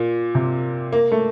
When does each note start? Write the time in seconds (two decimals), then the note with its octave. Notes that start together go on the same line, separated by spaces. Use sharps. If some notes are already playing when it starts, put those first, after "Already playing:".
Already playing: A#2
0.35 C3
0.93 A#3
1.12 A3